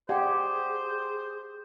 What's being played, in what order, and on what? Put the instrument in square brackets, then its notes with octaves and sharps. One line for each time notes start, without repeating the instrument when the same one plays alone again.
[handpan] G4 [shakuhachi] G#4 [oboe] C5 [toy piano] D5 F#5 G5